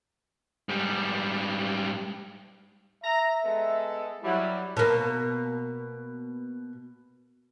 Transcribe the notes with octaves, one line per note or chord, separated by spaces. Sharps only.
G#2 G3
E5 A#5
G#3 B3 A4
F#3 G3 E4
B2 A#3